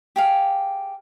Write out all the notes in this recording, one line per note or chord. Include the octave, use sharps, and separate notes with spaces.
G4 G#4 F5